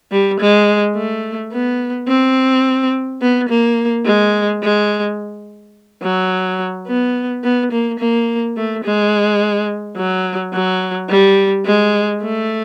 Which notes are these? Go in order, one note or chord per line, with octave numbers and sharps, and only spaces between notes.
G3
G#3
A3
B3
C4
B3
A#3
G#3
G#3
F#3
B3
B3
A#3
A#3
A3
G#3
F#3
F#3
G3
G#3
A3